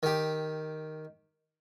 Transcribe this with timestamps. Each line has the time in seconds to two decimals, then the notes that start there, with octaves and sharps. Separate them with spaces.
0.03 D#3 G4